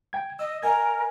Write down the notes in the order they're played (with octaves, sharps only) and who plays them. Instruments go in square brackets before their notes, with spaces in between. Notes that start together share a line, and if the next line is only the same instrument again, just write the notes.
[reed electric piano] G5 G#6
[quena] D#5 [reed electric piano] E6
[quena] A#4 [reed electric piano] D#5 G#5 G#6